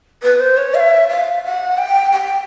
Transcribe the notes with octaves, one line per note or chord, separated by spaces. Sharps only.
B4
C5
C#5
F5
E5
F5
F#5
G5
G5